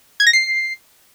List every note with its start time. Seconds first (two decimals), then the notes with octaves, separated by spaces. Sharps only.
0.20 G#6
0.27 A#6
0.33 C7